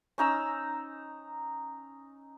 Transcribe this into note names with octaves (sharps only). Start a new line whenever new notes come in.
C#4 D#4 A#5 E6